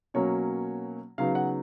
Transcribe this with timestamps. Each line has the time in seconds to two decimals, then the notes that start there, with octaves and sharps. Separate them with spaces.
0.14 B2 F#3 A#3 C#4 C#5
1.18 C#3 F#3 B3 D#4 F5
1.35 F#5